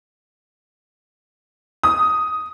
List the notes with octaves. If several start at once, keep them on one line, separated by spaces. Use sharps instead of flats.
D#6